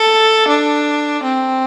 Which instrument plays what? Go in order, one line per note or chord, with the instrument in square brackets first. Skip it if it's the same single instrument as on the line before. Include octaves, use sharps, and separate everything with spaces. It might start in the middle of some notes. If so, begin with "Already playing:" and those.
Already playing: [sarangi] A4
D4
C4